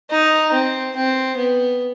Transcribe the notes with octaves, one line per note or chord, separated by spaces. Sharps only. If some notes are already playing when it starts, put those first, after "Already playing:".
D#4
C4
C4
B3